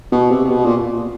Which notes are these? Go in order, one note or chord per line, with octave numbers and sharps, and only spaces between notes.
B2
C3
C3
B2
A#2